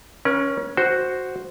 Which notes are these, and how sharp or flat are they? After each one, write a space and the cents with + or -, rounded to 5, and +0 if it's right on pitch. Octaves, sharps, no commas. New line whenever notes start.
C#4 +0 A#4 +45
F#4 +0 C5 +0